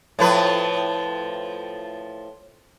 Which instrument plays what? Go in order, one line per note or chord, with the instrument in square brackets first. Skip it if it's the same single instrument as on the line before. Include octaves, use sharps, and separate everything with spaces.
[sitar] A2 F3 B4